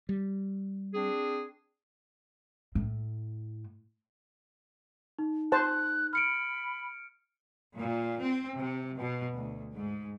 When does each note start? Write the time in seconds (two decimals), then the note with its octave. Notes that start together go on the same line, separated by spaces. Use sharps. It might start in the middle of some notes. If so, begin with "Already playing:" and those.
0.09 G3
0.94 C4 D4 G#4
2.75 A2
5.19 D#4
5.52 C5 A5 F#6
6.13 B5 F6 C#7 D7
7.75 A#2
8.20 C4
8.55 C3
8.97 B2
9.36 D2
9.76 G#2